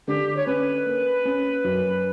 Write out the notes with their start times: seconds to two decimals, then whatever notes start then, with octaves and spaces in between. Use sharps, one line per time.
0.07 D3 G4
0.36 C#5
0.46 C#4 B4
0.86 A#3
1.25 C#4
1.64 F#2